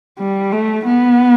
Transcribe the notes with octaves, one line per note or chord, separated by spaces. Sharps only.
G3
A3
B3